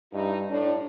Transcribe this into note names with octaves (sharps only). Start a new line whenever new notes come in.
G2 D#4 E4
A2 D4